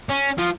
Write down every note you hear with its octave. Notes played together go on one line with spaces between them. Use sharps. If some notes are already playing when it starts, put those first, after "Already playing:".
C#4
F3